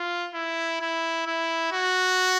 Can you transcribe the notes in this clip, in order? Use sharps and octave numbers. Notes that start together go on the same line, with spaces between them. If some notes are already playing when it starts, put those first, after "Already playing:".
Already playing: F4
E4
E4
E4
F#4